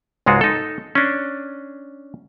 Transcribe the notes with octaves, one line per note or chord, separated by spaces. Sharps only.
C#2 G#2 G#3 F4 F#4
D#4 A4
C#4 D4